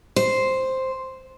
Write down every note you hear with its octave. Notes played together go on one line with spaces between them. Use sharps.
C5